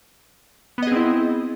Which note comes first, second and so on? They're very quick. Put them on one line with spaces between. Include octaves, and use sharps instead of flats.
B3 D#5 G#4 C4 E4